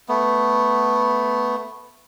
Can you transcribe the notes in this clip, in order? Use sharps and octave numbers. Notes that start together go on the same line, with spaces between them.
A3 B3